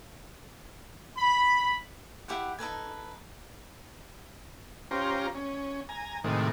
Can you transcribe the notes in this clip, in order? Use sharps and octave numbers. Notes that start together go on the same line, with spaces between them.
B5
E4 G4 G#4 F#5
D#4 A4 B4 G#5
C#4 F4 G4 C5 A#5
C#4
G#5 A#5
A2 C3 D#3 G#3